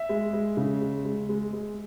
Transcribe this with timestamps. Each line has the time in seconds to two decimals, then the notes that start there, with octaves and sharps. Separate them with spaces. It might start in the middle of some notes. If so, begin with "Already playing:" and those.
Already playing: E5
0.09 G#3
0.33 G#3
0.57 C#3
0.81 G#3
1.05 G#3
1.29 G#3
1.53 G#3